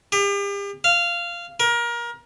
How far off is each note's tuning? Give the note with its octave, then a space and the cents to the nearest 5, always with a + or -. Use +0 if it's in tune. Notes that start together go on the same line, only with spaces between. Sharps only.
G4 +40
F5 -15
A#4 +25